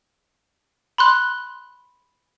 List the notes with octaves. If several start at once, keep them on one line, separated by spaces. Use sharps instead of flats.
B5 C6 F#6